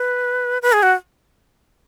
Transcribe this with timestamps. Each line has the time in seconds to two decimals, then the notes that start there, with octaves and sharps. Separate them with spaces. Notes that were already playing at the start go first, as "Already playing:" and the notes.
Already playing: B4
0.62 B4
0.73 G#4
0.83 F#4